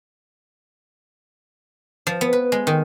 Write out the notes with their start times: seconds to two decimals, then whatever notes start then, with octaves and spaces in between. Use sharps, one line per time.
2.07 F3
2.21 B3
2.33 B4
2.52 G#3
2.67 D#3